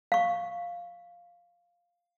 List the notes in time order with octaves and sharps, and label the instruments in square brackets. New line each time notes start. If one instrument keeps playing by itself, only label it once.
[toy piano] F5 C#6